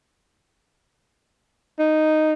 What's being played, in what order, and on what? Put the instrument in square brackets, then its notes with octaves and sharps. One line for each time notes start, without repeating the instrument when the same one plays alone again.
[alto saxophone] D#4